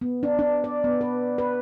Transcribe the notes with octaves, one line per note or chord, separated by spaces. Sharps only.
B3
D4
D4
D5
B3
B4
B4